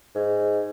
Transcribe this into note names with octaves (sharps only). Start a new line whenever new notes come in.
G#2